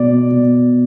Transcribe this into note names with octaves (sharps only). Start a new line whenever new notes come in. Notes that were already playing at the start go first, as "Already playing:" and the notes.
Already playing: B2 D5
B2